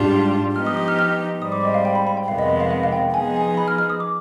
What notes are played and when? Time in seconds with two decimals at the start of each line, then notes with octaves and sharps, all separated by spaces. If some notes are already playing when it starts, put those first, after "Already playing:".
Already playing: G#2 G3 D4 F4
0.55 F3 B3 D#4 G4 F6
0.66 D#6
0.77 D#6
0.88 F6
0.99 F6
1.41 G#2 G3 C4 D#6
1.52 D6
1.65 D#5
1.74 F5
1.85 G5
1.95 B5
2.07 B5
2.17 G5
2.28 F2 C3 D#3 G#3 B3 F5
2.39 D#5
2.50 D#5
2.60 F5
2.71 F5
2.84 F5
2.92 G5
3.14 F3 B3 D#4 G#4 G#5
3.36 G#5
3.57 B5
3.68 F6
3.78 F6
3.90 D#6
4.00 D6